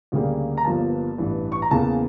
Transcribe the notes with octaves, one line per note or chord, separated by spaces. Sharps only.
D2 C#3 G3 A#3
A#5
G1 G2 F3 A#3 A5
A1 G2 E3
C#6
A#5
E2 C#3 E3 A#3 A5